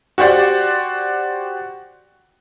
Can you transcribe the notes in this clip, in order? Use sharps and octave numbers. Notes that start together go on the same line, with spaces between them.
F#4 G4 C5 D5 F#5